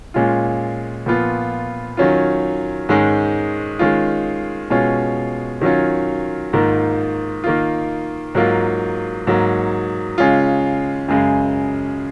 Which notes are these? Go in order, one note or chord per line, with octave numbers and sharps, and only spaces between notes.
A#2 G#3 C#4 F4
A#2 F3 B3 F4
D#3 F#3 C#4 F4
G#2 D#3 G#3 C#4
D#3 G#3 C#4 F4
B2 G#3 C#4 F4
D#3 F#3 C#4 F4
G#2 D#3 A#3 F4
D#3 A#3 F4
G#2 F#3 A#3 F4
G#2 F#3 A#3
C#3 G#3 C#4 F4
F#2 C#3 G#3